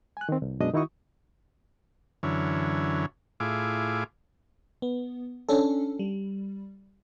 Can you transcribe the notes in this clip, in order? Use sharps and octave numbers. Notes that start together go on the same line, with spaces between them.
G#5 F#6
D#3 C4
C2
F#2 B2 G#3 D4 D#5 D#6
D#3 D#4 E4 F#4 C#6 D#6
F#2 D3 E3 C#4
A2 E4 F4 G#4 D6
B3
C#4 D4 A4
G3